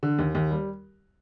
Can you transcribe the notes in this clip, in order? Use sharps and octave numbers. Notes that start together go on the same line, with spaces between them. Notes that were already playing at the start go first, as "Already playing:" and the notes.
D3
D#2
D#2
G3